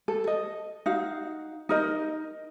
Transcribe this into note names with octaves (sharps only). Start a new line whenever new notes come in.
A4
D#5
D#4 F#4 F5
D#4 A#4 D#5